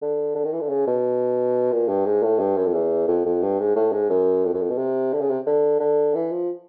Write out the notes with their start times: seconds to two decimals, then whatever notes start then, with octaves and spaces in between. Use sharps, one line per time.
0.02 D3
0.35 D3
0.44 D#3
0.52 E3
0.61 D3
0.69 C#3
0.87 B2
1.72 A#2
1.88 G2
2.05 G#2
2.23 A2
2.39 G2
2.57 F#2
2.66 F2
2.74 E2
3.08 F2
3.26 F2
3.42 G2
3.60 G#2
3.75 A2
3.93 G#2
4.10 F#2
4.45 F2
4.53 F#2
4.61 F2
4.70 B2
4.78 C3
5.13 D3
5.21 C#3
5.30 C3
5.46 D3
5.80 D3
6.15 E3
6.32 F3